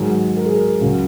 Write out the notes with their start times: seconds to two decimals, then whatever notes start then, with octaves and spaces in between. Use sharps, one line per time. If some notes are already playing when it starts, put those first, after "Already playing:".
Already playing: G#2 D#3 F#3 G#4
0.36 A#4
0.46 G#4
0.56 A#4
0.81 C#2 C#3 F#3